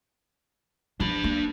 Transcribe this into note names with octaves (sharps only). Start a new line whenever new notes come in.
F3 B3 D4 B5
A#3